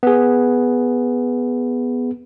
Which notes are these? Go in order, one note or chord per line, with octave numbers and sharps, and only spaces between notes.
B3 G#4